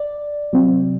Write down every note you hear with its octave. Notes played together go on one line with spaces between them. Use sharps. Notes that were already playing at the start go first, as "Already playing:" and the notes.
Already playing: D5
C3 F#3 C4